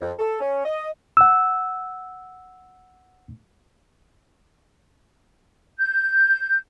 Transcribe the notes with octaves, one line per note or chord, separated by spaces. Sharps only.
F2
A4
C#4
D#5
F#5 E6
G6